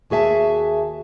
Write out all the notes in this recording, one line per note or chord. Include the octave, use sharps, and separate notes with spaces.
D#2 F#4 G#4 E5 A5